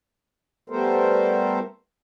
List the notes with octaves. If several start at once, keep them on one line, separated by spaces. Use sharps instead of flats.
G3 A3 B3 A4 A#4 C5